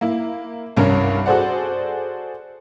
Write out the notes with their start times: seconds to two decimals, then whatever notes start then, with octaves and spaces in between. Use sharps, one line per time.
0.01 A#3 E4
0.77 C2 G2 C#4 A#4
1.26 F#4 G#4 A4 C5 D5 F#5